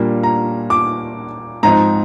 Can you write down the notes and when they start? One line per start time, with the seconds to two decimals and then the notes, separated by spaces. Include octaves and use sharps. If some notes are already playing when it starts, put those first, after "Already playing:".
Already playing: A#2 G3 A#3 D4
0.23 A#5
0.70 D6
1.63 G#2 F3 C4 D#4 A#5